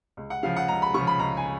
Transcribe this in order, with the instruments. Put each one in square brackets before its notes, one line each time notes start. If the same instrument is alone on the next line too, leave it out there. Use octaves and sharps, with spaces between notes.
[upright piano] C#2
F#5
C#3 F3 F5
F#5
C#2 A#5
B5
C#3 F3 C#6
B5
C#2 A#5
G#5